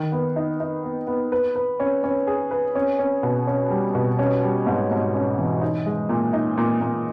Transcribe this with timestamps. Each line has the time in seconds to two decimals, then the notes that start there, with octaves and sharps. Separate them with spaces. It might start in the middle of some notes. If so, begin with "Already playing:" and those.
Already playing: D#3
0.12 B3
0.36 D#4
0.60 D#4
0.84 B3
1.07 B3
1.32 B4
1.56 B4
1.80 C#4
2.04 C#4
2.27 G#4
2.51 B4
2.75 C#4
2.99 C#4
3.23 B2
3.47 C#4
3.70 G3
3.95 B2
4.19 C#4
4.43 G3
4.66 G#2
4.91 G#2
5.14 C#4
5.38 E3
5.61 D#4
5.86 G#3
6.09 A#2
6.33 D#4
6.57 A#2
6.81 A#2